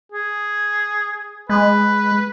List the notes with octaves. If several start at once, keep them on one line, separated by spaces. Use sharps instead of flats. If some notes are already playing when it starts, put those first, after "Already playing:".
G#4
G#3 B4